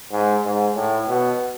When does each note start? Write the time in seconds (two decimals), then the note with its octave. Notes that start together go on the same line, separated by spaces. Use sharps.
0.12 G#2
0.44 G#2
0.75 A2
1.08 B2